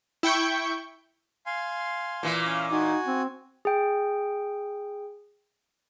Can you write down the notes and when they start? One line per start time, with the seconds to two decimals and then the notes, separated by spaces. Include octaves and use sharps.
0.23 E4 G5 C#6 G6
1.46 F5 G#5 C6
2.23 A#2 E3
2.45 C#4 F5
2.72 D#4 F#4 G#5
3.07 C4
3.65 G#4 G5